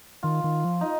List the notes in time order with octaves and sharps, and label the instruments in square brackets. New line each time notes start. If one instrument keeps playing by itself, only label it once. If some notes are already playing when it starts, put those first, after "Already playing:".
[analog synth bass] D#3 [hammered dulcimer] F4
[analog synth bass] D#3
F3
[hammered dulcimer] D#4